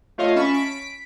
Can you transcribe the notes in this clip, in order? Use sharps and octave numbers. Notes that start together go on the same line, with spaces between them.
A3 F4 C#5 D#5 F5
C#4 A5 B5 C#6
B6 D7